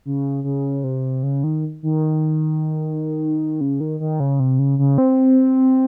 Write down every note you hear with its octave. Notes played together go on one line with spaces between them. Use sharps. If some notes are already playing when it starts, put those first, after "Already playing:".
C#3
C#3
C3
C#3
D#3
D#3
C#3
D#3
D#3
C#3
C3
C#3
C#3
C4